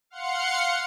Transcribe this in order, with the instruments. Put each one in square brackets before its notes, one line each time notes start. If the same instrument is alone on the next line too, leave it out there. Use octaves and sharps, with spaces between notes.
[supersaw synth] F5 F#5 C6 C#7